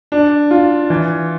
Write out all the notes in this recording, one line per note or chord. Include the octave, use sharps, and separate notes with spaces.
D4
F4
E3